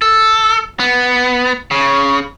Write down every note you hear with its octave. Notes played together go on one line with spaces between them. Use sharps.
A4
B3
C#3